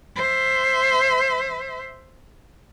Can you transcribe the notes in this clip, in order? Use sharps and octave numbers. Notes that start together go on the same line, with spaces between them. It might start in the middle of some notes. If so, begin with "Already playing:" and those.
C5 E5